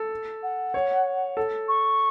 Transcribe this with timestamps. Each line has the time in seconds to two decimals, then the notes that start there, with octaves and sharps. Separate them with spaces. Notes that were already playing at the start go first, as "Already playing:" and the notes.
Already playing: A4
0.43 F#5
0.74 C#5
1.37 A4
1.68 C#6